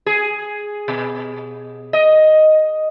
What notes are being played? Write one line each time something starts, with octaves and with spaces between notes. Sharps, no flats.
G#4
B2
D#5